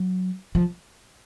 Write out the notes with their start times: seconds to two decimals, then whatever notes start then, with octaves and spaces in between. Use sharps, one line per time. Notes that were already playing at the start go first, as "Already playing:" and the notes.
Already playing: F#3
0.55 F3